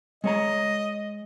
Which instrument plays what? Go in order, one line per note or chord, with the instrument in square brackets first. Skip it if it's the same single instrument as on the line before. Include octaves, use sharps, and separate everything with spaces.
[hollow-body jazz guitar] G#3 C#5 A#5 [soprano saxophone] D#5